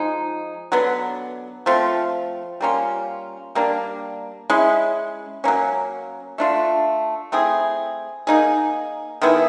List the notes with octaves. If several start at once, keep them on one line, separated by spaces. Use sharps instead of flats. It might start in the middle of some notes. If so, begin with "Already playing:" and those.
Already playing: F3 G#3 D#4
D3 F#3 B3
F3 A3 C4 F4
G3 A#3 C#4 F4
G3 A#3 D4
G#3 C#4 E4
F#3 A#3 C#4
A3 D4 F4
A3 C4 E4 G#4
A#3 D#4 G#4
D#3 G#3 B3 E4